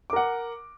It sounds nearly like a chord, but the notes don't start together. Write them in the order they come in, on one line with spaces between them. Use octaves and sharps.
D6 A#4 F#5